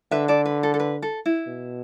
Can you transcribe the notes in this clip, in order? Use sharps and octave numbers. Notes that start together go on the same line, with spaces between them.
D3 B4 E5
A4 D5
B4
A4
A4
B4
A4
E4
B2